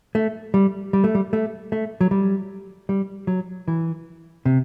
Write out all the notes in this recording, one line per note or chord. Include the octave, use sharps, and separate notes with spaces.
A3
G3
G3
A3
G3
A3
A3
F#3
G3
G3
F#3
E3
C3